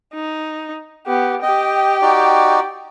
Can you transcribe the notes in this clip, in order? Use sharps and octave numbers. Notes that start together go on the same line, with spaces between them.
D#4
B3 G4
G4 D#5 G5
D#4 F#4 D5